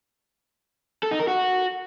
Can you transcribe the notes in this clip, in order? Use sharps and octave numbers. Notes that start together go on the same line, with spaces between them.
A4
D#4
A#4
F#4